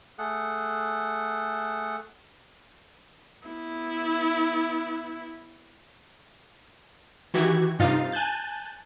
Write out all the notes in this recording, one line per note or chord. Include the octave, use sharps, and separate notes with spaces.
A3 G#4 A4 F#5
B3 E4
D#3 E3 F#4 G4 G#6
G2 C3 D#4 F4 F5 A6
G#5 A5 F#6 G6 A6